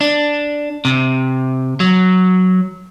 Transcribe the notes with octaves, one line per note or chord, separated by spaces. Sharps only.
D4
C3
F#3